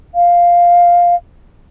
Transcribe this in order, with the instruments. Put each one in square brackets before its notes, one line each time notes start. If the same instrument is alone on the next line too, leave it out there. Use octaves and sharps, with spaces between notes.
[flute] F5